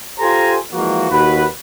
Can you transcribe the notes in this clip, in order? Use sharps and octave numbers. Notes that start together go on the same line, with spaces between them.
F4 G4 A4 C5 G#5 A#5
E3 F3 G#3 A#3 F#4
D#2 F#4 B4